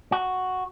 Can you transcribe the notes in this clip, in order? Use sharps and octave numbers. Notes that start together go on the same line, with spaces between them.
F#4